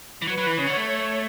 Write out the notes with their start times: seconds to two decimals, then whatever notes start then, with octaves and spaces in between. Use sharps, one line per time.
0.22 E3
0.27 F#3 B4
0.38 F#3
0.47 E3
0.57 C#3 C#5
0.67 D3
0.77 A3
0.85 C#5